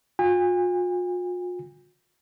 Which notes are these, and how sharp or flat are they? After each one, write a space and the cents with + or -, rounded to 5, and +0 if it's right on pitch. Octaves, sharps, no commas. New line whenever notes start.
F4 +45 G#5 -40